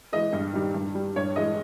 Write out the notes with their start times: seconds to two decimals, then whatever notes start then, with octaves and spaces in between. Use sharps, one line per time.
0.13 E3 G#3 D#5
0.33 G2
0.53 D#3 G3
0.74 G2
0.95 G3
1.16 G2 C#5
1.36 E3 G#3 D#5